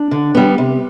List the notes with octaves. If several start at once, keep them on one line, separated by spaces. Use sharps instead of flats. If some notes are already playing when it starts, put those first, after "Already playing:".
Already playing: D4
D3
G3 B3
C3